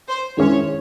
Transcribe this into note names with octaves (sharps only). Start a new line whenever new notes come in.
C5
D#3 G#3 C#4 E4 C#5